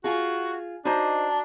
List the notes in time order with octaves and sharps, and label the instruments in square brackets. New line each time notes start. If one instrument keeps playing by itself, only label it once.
[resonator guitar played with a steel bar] F4 G#4 [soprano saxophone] F#4
[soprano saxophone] D4 [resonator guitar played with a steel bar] D#4 C5 D#5 [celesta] F#4 A#5 D6